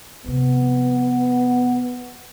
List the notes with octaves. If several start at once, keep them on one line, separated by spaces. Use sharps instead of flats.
C3 F3 B3